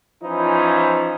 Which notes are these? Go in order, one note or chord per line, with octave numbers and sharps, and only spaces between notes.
E3 F3 C#4 D#4 E4